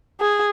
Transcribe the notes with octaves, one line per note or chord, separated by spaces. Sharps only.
G#4